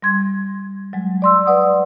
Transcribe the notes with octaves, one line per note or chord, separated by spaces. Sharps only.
G3 C6 G#6
F#3 G#3
D5 C6 E6
B4 D5 F#5 D#6